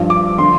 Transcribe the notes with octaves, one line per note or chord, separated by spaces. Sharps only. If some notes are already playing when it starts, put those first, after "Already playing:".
Already playing: G2 F3
D6
D3 F3 C6